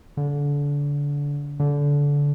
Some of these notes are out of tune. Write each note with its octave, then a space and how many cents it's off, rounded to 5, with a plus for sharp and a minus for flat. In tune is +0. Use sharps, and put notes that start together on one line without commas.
D3 -30
D3 -25